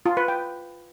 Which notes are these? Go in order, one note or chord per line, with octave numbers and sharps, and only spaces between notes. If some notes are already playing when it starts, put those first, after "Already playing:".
F4
B4
G5